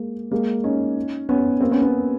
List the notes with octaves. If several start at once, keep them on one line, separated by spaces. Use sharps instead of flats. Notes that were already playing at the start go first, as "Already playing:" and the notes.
Already playing: G#3 A#3
G#3 A#3
C#4 D#4
B3 C#4
A#3 C4
B3 C#4
B3 C#4